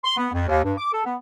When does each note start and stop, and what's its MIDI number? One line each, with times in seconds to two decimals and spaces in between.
0.05 0.15 84
0.17 0.28 59
0.33 0.46 41
0.48 0.61 39
0.64 0.73 43
0.78 0.89 86
0.93 1.03 69
1.05 1.15 59